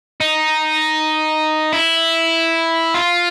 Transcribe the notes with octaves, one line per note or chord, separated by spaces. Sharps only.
D#4
E4
F4